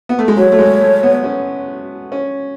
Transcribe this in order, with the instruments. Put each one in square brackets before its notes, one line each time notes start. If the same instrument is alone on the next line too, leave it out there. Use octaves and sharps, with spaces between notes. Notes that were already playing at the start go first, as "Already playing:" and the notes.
[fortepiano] B3
A3
G#3
[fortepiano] F#3 [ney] C#5
[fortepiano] A3
G#3
A3
B3
C#4
C#4